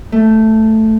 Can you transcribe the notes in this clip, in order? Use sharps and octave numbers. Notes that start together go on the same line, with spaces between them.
A3